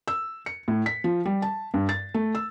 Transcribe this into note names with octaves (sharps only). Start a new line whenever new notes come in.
E6
C#7
A2
B6
F3
G3
A5
G2
A6
A3
E6